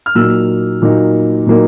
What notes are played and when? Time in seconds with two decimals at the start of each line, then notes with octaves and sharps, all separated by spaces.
0.06 F6
0.15 A#2 F#3 A#3 D#4 E6
0.82 A#2 F#3 A#3 D#4
1.46 A#2 F#3 A#3 D#4